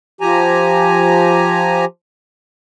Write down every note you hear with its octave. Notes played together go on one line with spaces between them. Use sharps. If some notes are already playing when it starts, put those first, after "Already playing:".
F3 G4 G#5 A#5